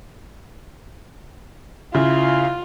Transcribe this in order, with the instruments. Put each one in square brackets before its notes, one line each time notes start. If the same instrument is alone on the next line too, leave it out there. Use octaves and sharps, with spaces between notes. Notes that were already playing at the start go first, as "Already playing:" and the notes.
[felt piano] C#3 [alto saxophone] E4 [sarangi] F4 [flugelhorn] F5